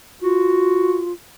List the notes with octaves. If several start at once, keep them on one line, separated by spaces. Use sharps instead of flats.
F4 F#4